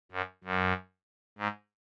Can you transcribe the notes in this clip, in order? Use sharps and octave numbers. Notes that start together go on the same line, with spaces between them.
F#2
F#2
G#2